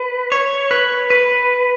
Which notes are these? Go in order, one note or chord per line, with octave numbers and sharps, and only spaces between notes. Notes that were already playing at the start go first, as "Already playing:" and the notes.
Already playing: B4
C#5
B4
B4